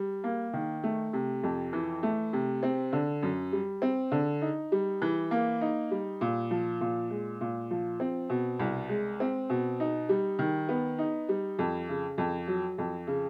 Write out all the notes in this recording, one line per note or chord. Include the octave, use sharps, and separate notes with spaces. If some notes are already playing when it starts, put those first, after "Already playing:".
Already playing: G3
A#3
D#3
A3
C3
F2
E3
A3
C3
C4
D3
F#2
G3
C4
D3
D#4
G3
E3
A#3
D#4
G3
A#2
F3
A#2
G#3
A#2
F3
C4
B2
C2
G#3
C4
B2
D#4
G3
D#3
B3
D#4
G3
F2
C#3
F2
F#3
F2
C#3